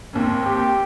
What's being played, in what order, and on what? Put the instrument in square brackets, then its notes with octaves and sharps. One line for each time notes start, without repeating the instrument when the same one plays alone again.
[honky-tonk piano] G#1 D#2 [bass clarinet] C4
[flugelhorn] G4